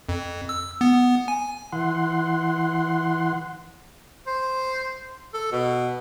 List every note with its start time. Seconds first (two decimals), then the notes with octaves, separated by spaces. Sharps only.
0.09 F2
0.49 E6
0.81 B3
1.28 G#5
1.73 E3 F#5 C6
4.27 C5
5.34 A4
5.52 B2